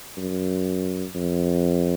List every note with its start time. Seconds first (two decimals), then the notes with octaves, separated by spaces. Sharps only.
0.17 F#2
1.15 F2